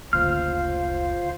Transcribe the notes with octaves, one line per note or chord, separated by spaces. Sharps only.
F#1 D2 F4 C5 F5 F6